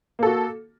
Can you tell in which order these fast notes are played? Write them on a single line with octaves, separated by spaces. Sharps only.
A#3 A4 F#4